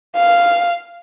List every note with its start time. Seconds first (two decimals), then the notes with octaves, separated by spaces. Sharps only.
0.16 F5